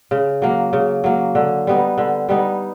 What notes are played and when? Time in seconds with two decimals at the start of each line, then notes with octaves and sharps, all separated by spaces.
0.11 C#3
0.42 F#3 A#3
0.73 C#3
1.04 F#3 A#3
1.35 D3
1.67 G3 B3 D#4
1.98 D3
2.29 G3 B3 D#4